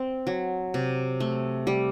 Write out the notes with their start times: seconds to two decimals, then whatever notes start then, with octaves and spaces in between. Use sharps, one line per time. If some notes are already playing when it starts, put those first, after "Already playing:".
Already playing: C4
0.27 F#3
0.74 C3
1.20 A3
1.67 G3